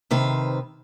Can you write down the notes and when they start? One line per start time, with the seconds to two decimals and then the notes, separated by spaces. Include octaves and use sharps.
0.11 C3 D#3 B4 C5